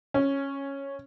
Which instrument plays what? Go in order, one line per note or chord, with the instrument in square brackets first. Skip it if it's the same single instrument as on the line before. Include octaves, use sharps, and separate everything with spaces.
[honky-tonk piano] C#4